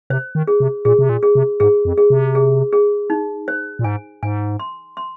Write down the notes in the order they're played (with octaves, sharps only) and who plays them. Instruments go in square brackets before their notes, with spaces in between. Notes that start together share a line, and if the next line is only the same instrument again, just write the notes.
[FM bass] C3 [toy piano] C5
[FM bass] D#3
[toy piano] G#4
[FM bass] C3
[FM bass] A#2 [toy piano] G#4
[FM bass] C3
A#2
[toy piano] G#4
[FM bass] C3
[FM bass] G#2 [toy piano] G#4
[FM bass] F2
[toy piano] G#4
[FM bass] C3
[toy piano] G#4
G#4
D#4
C5
[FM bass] A#2
[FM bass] G#2 [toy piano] G#5
[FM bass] G#2 [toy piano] G#5
[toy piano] C6
C6